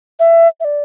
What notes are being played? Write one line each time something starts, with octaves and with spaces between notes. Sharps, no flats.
E5
E5
D5